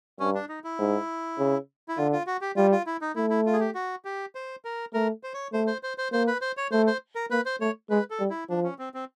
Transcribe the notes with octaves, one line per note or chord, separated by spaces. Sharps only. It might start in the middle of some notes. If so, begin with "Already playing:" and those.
G2 C#4
D4
D#4
E4
G#2
C#3
E4
D3 F4
F4
F#4
G4
G3 F4
F4
E4
D#4
A3 E4
E4
F4
G#4
G4
F#4
G4
C5
A#4
A3 A#4
C5
C#5
A3 C5
C5
C5
C5
A#3 C5
B4
C5
C#5
A3 C5
C5
A#4
A#3 B4
C5
A3 C#5
G#3 B4
A4
G3
E4
F3 D4
C#4
C4
C4